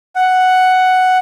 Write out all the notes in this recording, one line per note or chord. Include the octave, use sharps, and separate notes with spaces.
F#5